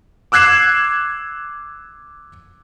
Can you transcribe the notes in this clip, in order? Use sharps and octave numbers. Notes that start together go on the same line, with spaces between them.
D6 E6 F#6 G#6 C7 E7